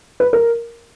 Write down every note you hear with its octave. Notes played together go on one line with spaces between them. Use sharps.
B4
A#4